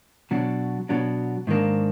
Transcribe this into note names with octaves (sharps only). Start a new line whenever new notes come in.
B2 F#3 D4
B2 F#3 D4
G#2 D#3 A#3 D4